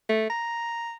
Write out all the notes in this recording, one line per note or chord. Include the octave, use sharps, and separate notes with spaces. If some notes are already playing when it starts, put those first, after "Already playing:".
A3
A#5